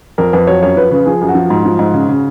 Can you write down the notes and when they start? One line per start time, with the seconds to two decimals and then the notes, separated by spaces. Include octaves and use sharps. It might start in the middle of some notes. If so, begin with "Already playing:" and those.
0.18 F2 A#4
0.33 F2 B4
0.47 F#3 C#5
0.62 F#2 C#5
0.76 F3 B4
0.91 C#3 B4
1.06 F3 G#4
1.21 F#2
1.28 F#4
1.35 F3
1.50 G#2
1.65 F3
1.79 G#2
1.94 C#3
2.09 C#3